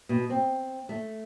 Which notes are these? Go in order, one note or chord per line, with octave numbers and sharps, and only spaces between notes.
B2
C4
A3